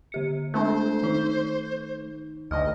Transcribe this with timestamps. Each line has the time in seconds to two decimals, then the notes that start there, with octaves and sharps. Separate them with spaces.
0.12 D3 G4 C#7
0.54 G#3 A3 C4 D4 C5
1.03 D#3 D#4
2.51 D2 D#5 F6